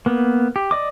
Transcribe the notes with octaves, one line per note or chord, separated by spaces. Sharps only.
A#3 B3
G4
D5 D#5 D6